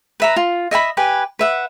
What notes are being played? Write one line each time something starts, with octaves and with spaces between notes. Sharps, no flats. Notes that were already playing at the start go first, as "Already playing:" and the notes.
B4 E5 A#5
F4
D#5 E5 G#5 B5
G4 B4 G#5
B4 E5 F#5